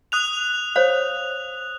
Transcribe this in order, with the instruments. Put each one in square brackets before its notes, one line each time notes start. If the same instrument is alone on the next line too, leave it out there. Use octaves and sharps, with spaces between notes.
[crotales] D#6 F#6 F7
[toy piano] C5 C#5 F5